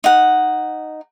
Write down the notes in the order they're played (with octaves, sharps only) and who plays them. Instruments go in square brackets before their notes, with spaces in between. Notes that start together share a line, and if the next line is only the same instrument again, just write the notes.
[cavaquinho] D#4 F#5